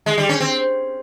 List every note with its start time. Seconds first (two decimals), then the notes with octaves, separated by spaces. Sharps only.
0.06 G#3
0.18 G3
0.29 C#4
0.41 C4